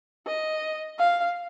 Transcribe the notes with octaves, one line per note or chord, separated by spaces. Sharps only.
D#5
F5